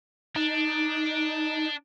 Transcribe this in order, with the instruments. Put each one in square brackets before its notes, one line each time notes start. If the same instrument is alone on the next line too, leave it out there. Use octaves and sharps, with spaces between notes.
[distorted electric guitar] D4 [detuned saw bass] D#4